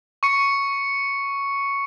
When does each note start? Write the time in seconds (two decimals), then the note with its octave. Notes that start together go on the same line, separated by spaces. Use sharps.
0.23 C#6 C#7